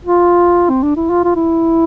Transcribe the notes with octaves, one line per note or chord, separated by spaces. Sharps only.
F4
C4
D4
E4
F4
F4
E4